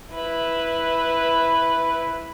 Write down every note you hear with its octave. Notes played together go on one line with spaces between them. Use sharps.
E4 B4